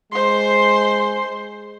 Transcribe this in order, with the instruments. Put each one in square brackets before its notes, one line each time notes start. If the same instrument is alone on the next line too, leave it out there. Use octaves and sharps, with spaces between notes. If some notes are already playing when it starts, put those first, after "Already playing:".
[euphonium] G#3 [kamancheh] C5 C6